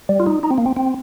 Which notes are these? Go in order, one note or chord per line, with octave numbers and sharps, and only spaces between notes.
G3
F4
D#4
D#4
C4
A#3
C4
C4